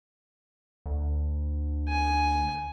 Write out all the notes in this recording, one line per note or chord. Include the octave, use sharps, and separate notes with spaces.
D2
G#5